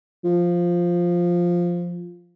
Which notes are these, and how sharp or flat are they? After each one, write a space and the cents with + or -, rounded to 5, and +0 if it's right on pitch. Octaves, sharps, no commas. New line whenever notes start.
F3 +0